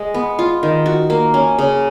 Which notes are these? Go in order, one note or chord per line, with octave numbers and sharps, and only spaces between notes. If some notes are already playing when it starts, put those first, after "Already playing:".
Already playing: G#3
B3
F4
D#3
F#4
A#3
C#4
C#3